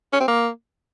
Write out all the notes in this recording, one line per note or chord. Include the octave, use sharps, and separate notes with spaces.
C#4
C4
A#3